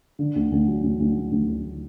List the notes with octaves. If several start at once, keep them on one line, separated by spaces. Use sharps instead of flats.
D3
D2
D2
F#3
D2
D2
D3
D2
D2